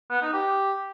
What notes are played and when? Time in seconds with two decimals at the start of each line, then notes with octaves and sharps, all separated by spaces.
0.10 B3
0.22 D#4
0.33 G4